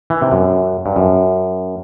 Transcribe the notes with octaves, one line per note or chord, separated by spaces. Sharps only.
E3
C3
F#2
G2
F#2